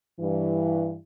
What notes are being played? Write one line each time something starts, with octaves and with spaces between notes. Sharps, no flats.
G2 E3